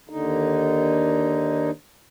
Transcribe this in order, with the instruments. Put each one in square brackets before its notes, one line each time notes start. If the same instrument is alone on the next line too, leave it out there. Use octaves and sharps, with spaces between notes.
[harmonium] D#2 D3 D#4